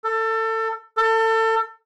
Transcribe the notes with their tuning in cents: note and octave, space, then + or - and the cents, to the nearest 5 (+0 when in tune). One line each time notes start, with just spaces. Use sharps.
A4 +25
A4 +30